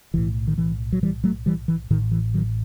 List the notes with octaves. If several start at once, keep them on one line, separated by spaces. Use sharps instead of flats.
B1 A2 E3
D#3
E3
F#3
E3 G3
F#3 A3
E3 G3
E3
A1 A2 D#3
E3
D#3 F#3